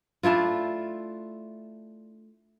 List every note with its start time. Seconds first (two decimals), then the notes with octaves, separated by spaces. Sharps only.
0.23 A3 D4 E4 F4